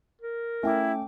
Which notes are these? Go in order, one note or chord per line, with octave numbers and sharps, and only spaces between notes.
A#4
A3 C#4 E4 G5 D6